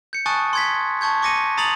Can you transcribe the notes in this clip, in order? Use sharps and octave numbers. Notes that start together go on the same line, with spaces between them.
G6 C#7
G#5 A5 C#6 D#6 F#6 A6
C6 G#6 B6
A5 C#6 G6 G#6
C#6 D6 A#6 C#7 D#7
A#5 D#6 A6 C7 F7 F#7